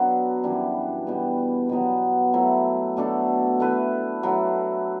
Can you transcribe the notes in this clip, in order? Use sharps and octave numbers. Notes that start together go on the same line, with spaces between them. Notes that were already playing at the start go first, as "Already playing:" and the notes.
Already playing: F#3 B3 D4 F#4
F#2 E3 G3 D4
B2 G3 B3
B2 F#3 B3
F#3 A3 E4
B2 A3 D4 A4
A3 E4 B4
F#3 A3 E4